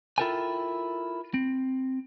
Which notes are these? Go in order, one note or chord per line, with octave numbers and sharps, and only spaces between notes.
E4 F4 A4 A#4 G5 G#5
C4